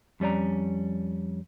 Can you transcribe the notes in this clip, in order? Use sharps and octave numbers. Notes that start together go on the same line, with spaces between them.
F2 G3 C#4 D5 A#5